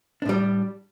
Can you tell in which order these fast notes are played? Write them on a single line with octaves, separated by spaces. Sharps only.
D4 A2 G3